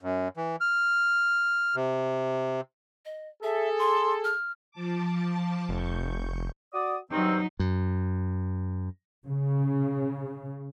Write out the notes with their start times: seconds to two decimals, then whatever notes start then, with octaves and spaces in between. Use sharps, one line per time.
0.01 F#2
0.37 E3
0.61 F6
1.76 C3
3.05 D#5
3.43 G#4 A4 E5
3.79 C6
4.24 F6
4.71 F3 A5 D6
5.69 F1 C#6 G6
6.74 F#4 D5 D#6
7.11 G2 D#3 F#3 C4 D#4
7.59 F#2
9.25 C#3